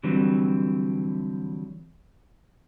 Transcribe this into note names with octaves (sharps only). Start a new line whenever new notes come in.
D3 E3 F#3 G3 C4